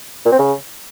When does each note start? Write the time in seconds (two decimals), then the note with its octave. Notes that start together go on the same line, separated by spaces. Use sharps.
0.25 A#2
0.32 C4
0.39 C#3